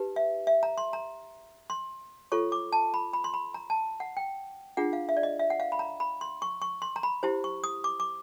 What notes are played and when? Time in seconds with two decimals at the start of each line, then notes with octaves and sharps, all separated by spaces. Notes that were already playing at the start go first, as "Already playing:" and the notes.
Already playing: D#4 G4 B4
0.16 E5
0.47 E5
0.63 A#5
0.78 C6
0.93 A#5
1.70 C6
2.32 F4 A4 C#5 C#6
2.52 D6
2.72 A5
2.94 B5
3.13 B5
3.24 C6
3.34 B5
3.54 A#5
3.70 A5
4.00 F#5
4.17 G5
4.77 D4 F4 G#4 F#5
4.93 F5
5.09 E5
5.17 D5
5.23 D#5
5.39 E5
5.50 F#5
5.60 F5
5.72 B5
5.79 A#5
6.00 B5
6.21 C6
6.42 C#6
6.62 C#6
6.82 C6
6.96 A#5
7.03 B5
7.23 E4 G4 C5
7.44 C#6
7.64 D#6
7.84 D6
8.00 D6